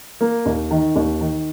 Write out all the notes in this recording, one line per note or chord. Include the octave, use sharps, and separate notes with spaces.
A#3
D#2
D#3
D#2
D#3